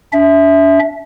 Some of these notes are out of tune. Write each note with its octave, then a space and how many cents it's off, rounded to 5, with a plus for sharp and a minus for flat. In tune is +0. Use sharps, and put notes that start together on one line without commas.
D4 -40 E5 -5